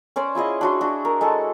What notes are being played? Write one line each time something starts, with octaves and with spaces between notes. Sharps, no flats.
C#4 C5 D5
E4 F4 G#4 D#5
D4 F#4 C6
D4 F#4
A#4
G#3 A4 F#5 A5